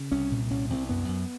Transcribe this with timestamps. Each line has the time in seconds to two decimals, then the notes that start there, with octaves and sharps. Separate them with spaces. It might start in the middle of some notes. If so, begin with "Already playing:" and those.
Already playing: C#3
0.12 C2 C#4
0.31 A#2
0.51 C2 C#4
0.70 C2 C4
0.89 F#2 B3
1.09 F#2